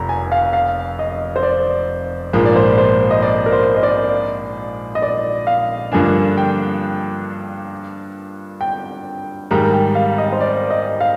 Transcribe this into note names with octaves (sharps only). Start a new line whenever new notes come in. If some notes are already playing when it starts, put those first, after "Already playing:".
Already playing: F1 F2 A#5
G#5
F5
F5
D#5
C5
D5
A#1 G#2 F3 A#3
D5
C5
C5
D#5
D5
A#4
C5
D#5
D5
D#5
D5
F5
G2 D3 F3 A#3 D4 G#5
G5
G5
G#2 D#3 G3 A#5
G5
F5
D#5
C5
D5
D#5
F5